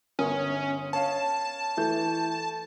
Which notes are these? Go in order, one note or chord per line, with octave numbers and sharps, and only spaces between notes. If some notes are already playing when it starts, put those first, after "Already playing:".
G1 C#4 A#4 D#6
C#5 F5 A5
E3 A3 G6